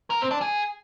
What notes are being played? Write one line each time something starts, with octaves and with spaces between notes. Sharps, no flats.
A#4
C4
D4
G#4